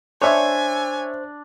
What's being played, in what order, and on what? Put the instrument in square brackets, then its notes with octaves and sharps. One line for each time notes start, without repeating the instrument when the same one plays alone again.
[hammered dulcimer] D4 [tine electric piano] C5 [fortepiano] C#5 E5 C#6 [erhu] G#5